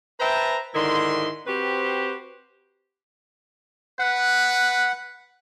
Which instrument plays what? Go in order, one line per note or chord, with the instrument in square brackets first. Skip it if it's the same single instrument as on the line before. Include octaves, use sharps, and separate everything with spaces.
[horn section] B4 C5 E5 G5 A5 A#5
G#2 D3 D#3 E4 C6
C4 F#4 G4 B4 C5
[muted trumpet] B4 [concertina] F#5